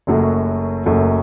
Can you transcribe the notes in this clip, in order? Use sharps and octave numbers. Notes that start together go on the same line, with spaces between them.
F#1 F#2 F#3 A3
F#1 F#2 F#3 A3